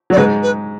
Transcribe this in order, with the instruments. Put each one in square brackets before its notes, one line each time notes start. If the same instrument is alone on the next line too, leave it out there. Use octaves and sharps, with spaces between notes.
[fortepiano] F#3 [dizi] D5
[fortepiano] G#2 G#3 [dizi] B4
[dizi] B4